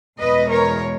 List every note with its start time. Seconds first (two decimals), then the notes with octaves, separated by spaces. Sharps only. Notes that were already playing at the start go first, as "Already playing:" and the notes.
0.19 E2 B2 G#3 B4 D#5
0.49 A#4 C#5